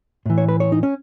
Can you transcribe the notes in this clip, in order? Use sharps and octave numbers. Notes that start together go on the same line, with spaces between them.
A2 E3
C#5
B4
C#5
D#4
C#4